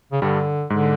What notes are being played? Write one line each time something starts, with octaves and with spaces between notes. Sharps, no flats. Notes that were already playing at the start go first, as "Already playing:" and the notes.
C#3
G2 D3 G3
G#2 D3 G#3